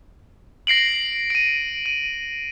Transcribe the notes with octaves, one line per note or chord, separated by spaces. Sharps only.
A#6 C7 D7 F#7
D7 D#7
D#7